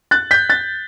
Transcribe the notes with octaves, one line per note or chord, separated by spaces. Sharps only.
F#6 A6
G6 B6
F#6 A6